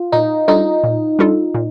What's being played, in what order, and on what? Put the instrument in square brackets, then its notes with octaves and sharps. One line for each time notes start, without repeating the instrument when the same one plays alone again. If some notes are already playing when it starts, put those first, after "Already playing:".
Already playing: [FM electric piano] F4
[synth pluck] A#2 [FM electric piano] D#4
[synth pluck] G3 D4 F4 A4 [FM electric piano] D#4
[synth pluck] A#2
G3 D4 F4 A4
A#2